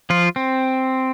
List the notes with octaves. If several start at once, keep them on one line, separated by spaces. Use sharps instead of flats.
F3 F4
C4